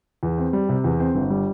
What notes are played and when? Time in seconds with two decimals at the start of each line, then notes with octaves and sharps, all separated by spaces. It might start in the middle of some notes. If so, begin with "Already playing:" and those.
0.23 E2
0.38 C4
0.53 G3
0.69 C3
0.84 E2
1.00 C4
1.15 G1
1.30 G3